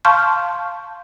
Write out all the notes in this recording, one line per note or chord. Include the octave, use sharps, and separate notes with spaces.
F5 A5 C6 C#6 F6 G6